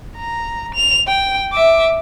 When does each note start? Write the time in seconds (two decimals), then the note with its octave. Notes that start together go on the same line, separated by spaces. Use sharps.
0.17 A#5
0.75 F7
1.07 G5
1.52 E5 D6